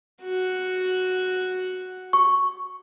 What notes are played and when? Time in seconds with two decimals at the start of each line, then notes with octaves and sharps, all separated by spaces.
0.22 F#4
2.13 C#6